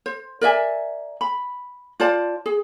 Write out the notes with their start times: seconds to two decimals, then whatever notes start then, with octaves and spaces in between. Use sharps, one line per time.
0.06 C5
0.41 A#4 D5 E5 G#5
1.21 B5
2.00 F4 C5 D5 A5
2.46 G#4